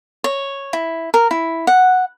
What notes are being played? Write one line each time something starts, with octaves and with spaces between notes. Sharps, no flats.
C#5
E4
A#4
E4
F#5